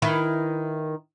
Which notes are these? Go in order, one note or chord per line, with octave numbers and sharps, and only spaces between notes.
D#3 E4 B4